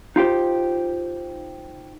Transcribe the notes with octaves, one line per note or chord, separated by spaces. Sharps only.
D#4 F4 G4 C5